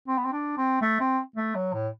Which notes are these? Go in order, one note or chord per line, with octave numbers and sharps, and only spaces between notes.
C4
B3
C4
D4
C4
A3
C4
A3
F#3
A2